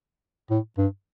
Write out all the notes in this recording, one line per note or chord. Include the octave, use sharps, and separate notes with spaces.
A2
G2